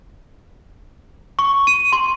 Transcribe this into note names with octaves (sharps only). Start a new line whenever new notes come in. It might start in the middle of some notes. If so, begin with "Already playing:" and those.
C#6
D#7
C6